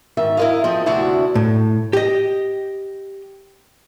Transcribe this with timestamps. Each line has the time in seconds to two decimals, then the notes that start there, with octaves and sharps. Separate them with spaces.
0.17 G#2 D#3 E5
0.37 E4 A#4 B4 D#5 F5
0.64 F3 C4 G#4
0.86 D2 C3 B3 D4 E4 F#4
1.35 A2
1.93 G4 D#5